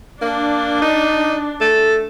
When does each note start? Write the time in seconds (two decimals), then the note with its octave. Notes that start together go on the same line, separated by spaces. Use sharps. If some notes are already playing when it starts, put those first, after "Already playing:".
0.21 A#3 D4
0.82 D#4
1.61 A3 A4